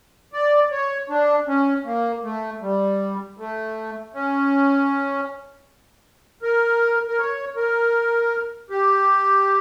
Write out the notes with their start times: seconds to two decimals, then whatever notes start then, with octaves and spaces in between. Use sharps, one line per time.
0.33 D5
0.71 C#5
1.10 D4
1.47 C#4
1.85 A#3
2.24 A3
2.62 G3
3.37 A3
4.14 C#4
6.42 A#4
7.07 A#4
7.18 C#5
7.56 A#4
8.70 G4